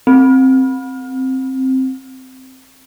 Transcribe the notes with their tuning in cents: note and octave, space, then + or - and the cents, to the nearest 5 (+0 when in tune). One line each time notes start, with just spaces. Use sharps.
C4 +5